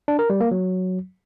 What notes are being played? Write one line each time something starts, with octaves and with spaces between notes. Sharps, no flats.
D4
A#4
G3
A#3
F#3